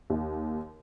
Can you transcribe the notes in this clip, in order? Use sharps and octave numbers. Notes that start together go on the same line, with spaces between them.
D#2